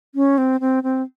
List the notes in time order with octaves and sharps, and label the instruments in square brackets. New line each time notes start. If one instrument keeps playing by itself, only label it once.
[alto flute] C#4
C4
C4
C4